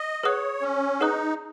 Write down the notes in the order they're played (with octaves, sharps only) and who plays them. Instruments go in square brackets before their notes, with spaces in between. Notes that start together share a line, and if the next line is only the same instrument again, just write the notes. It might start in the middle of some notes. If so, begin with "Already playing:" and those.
Already playing: [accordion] D#5
[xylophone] G#4 B4 F#5 D#6 F#6 [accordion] C#5
[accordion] C#4
[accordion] D#4 [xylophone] G#4 B4 F#5 D#6 F#6